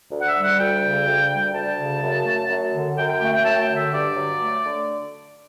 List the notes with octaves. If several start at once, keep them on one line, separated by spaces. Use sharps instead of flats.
D2
F#5
E5
G3
F#5
D2 G5
C#3
D2
G3
D2 A5
C#3
F#2
A3
F#2
D3
F#2 G5
G5
A3 G5
G5
F#2 A5
G5
D3
E5
G2 D5
F#3
A3
D3